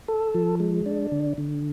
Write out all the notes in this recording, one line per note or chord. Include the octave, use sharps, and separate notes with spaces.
A4
F3
G#3
D4
D3
D3